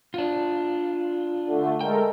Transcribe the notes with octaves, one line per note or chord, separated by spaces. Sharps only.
D4 F4
D3 A3
G#3 A4 A#4 G5